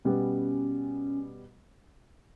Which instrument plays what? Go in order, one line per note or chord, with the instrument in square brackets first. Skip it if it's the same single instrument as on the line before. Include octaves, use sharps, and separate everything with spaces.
[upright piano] B2 G3 B3 [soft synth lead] C#4